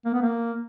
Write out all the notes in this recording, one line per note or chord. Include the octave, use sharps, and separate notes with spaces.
A#3
B3
A#3